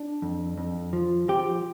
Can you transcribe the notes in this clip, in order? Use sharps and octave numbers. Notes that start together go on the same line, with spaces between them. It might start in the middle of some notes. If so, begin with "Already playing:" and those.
Already playing: D4
F2
F2
F3
F3 G4